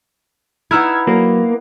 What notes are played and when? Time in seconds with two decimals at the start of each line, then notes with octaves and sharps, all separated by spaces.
0.71 B3 D#4 E4 E6 F6 G#6
1.07 F#3 A#3